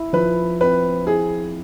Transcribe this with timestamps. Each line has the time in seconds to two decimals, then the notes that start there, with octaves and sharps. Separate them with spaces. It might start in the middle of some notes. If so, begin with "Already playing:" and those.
Already playing: E4
0.13 F3 B4
0.60 C4 B4
1.07 E4 G#4